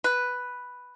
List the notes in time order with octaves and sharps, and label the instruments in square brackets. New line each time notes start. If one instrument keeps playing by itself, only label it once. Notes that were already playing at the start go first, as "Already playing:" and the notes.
[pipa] B4